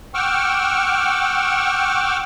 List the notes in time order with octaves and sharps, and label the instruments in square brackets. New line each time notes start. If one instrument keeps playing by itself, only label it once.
[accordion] F#5 G5 C#6 D6 E6 F6